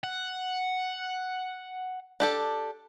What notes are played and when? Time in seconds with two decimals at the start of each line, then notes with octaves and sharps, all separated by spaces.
0.04 F#5
2.20 D4 G4 A4